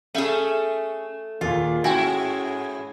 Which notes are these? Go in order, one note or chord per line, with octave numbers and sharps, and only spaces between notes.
A3 C#4 G#4 E5
D#2 A#2 A#3 F4 G#4
G#2 C#4 E4 F#4 G#4 G5 G#5 G#6